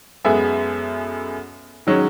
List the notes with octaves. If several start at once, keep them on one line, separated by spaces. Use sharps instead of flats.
F#2 G#3 B3 A4 E5 G#5
D#3 F#3 G#3 C#4